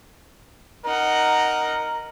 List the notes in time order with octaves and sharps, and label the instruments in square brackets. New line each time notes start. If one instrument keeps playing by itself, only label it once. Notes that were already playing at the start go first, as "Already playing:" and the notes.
[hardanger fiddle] D#4 F#5 [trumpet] A#4